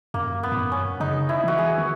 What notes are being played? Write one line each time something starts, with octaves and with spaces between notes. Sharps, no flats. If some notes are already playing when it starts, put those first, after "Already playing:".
F#2 A#3
B3
G#2
F#2
C#4
C#3 D#4
E4
E3 F#4
G#4
D#3